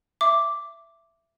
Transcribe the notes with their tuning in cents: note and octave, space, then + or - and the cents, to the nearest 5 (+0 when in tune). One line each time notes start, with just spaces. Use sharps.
E5 +15 D6 -5